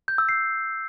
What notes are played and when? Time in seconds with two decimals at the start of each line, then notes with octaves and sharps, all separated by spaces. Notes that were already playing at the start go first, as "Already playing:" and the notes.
0.08 G6
0.18 E6
0.29 C7